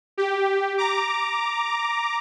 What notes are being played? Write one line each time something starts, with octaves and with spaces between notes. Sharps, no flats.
G4
A#5 D6